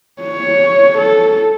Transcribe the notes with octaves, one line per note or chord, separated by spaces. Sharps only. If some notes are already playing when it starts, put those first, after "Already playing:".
C#5
A4